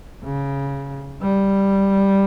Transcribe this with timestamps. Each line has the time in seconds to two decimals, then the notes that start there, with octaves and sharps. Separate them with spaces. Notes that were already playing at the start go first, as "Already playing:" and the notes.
0.24 C#3
1.22 G3